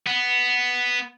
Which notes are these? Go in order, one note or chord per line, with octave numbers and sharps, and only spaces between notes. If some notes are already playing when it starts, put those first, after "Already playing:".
B3